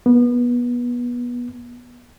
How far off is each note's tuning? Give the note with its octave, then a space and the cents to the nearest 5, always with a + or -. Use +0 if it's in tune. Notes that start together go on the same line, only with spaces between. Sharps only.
B3 -25